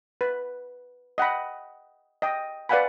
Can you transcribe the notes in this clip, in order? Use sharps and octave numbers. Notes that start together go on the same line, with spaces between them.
B4
D#5 F#5 G5 B5
D#5 G5
B4 D5 F5 F#5 G#5 B5